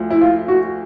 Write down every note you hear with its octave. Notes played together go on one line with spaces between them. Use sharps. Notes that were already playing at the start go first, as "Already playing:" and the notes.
Already playing: D2 F3
E4
F4
F#4